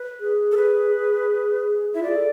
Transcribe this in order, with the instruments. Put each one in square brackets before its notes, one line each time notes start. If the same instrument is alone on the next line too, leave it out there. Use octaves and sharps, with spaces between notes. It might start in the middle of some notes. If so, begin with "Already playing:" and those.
Already playing: [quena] B4
[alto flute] G#4
[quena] A4
B4
[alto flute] E4 [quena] E5
[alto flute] F4 [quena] D5
[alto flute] G#4
A4